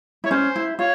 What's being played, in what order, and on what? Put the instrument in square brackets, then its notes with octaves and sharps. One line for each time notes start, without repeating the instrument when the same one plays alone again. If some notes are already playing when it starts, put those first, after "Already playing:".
[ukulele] E4 [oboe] C#5
[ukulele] C#4 [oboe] C5
[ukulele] E4
[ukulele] F4 [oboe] C#5